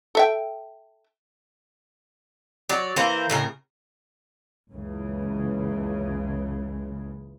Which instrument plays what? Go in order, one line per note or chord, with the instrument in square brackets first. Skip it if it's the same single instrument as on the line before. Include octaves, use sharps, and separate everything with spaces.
[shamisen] A4 E5 G5
[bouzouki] F#3 C#5 D5
E3 A#3 A#4 C5
A2 C#3 A#4
[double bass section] F#1 C#2 C#3 E3 G#3